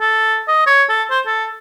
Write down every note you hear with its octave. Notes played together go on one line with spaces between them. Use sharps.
A4
D#5
C#5
A4
C5
A4